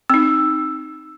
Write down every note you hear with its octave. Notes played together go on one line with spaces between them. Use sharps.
C4 D#4 E6